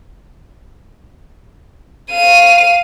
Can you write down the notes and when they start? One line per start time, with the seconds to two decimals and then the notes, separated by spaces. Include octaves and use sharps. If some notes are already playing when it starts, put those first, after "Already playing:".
2.11 F5 D#7